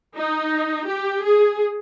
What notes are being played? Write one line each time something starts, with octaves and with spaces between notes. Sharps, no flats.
D#4
G4
G#4